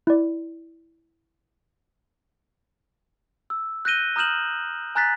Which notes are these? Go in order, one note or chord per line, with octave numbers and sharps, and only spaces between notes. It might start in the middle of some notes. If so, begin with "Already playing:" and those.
E4 D5
E6
F#6 G6 A#6 D#7 G7
A#5 D#6 F6 G6 E7 F#7
G#5 A#5 F#6 A6 B6